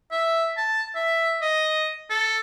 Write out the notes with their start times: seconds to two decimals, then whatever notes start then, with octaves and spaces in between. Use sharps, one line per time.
0.11 E5
0.57 A5
0.95 E5
1.41 D#5
2.10 A4